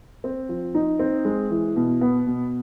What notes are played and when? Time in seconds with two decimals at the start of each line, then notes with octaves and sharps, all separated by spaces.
0.24 C4
0.49 F3
0.75 D#4
0.99 C4
1.25 G#3
1.51 E3
1.76 B2
2.01 B3
2.27 B2